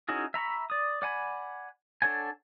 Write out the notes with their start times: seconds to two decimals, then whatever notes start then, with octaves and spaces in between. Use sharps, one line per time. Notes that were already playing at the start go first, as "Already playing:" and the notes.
0.09 C#4 D#4 E4 F#4 G#4
0.34 E5 A#5 B5 C#6
0.70 D5 D#6
1.02 D5 F#5 G#5 B5
2.02 D4 A4 C#5 F#5 G#5